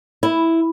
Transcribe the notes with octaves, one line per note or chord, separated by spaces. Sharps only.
E4